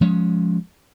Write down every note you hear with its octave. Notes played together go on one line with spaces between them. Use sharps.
F3 G#3 C#4